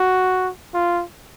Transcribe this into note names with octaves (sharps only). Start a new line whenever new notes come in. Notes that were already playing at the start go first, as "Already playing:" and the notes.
Already playing: F#4
F4